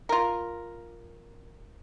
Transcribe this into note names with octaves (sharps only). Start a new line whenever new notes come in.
F4 A#4